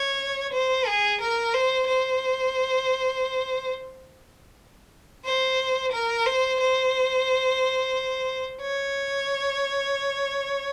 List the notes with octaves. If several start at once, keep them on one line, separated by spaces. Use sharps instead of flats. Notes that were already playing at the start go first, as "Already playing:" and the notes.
Already playing: C#5
C5
G#4
A#4
C5
C5
C5
A#4
C5
C5
C#5